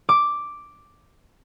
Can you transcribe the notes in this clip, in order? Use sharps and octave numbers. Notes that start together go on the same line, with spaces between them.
D6